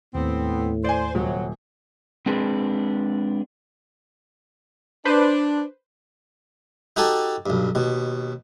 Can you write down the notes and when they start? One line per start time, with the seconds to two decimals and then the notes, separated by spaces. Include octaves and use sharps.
0.15 D#2 A2 B3 C4
0.84 C5 D5 G#5
1.15 D#1 C3 F#3
2.26 G#3 C4 D4 G#4 B4
5.05 D4 B4 C5
6.96 D#4 F#4 G4 A4 G#5 A5
7.46 B1 G2
7.75 D#2 B2